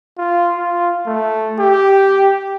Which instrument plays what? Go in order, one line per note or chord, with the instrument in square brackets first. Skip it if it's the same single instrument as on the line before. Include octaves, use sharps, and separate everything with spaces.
[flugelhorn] F4
F4
A3
G4